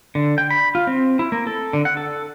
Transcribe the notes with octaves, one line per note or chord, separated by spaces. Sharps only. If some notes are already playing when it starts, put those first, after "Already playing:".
D3
G5
B5
F4
C4
E4
A#3
A4
D3
F#5
A4